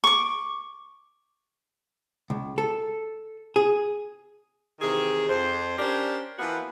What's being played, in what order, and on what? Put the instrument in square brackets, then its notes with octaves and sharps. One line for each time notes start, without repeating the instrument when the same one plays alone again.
[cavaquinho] C#6 D6
[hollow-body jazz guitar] C#2
A4
G#4
[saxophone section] C3 D#3 E3 G#4
F2 C5
C#4 D4 G4 A#4 C5 D5
E3 F3 A#3 B3 E4 F#4